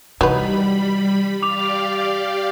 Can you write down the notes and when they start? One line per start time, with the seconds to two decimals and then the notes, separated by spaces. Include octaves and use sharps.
0.21 C3 E3 F#3 G3 D#4 B4 B5
1.42 G4 D5 F5 D6 F7